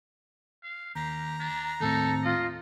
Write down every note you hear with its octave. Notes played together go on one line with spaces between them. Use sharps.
F5
D#2 G4 A#5
D4
D#2 A2 C4 D#4 A4
F4 D#5